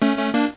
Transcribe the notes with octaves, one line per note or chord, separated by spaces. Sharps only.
A3 C#4
A3 C#4
A#3 D4